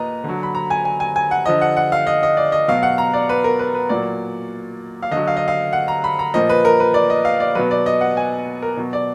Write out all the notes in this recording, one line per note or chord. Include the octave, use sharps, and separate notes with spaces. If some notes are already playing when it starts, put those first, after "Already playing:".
Already playing: A#2 B4 D#5 A#5
D3 F#3
B5
A#5
G#5
G#5
G#5
G#5
F#5
D3 F3 D#5
F#5
F#5
F5
D#5
D#5
D5
D#5
B2 F#3 F5
F#5
A#5
D5
B4
A#4
B4
B4
A#2 F#3 D5
F5
D3 F#3 D#5
F5
D#5
F5
F#5
A#5
B5
A#5
A#2 F3 D#5
B4
A#4
B4
D5
D#5
F5
D5
B2 F#3 B4
D5
D#5
F#5
G#5
A#4
B2 F#3
D5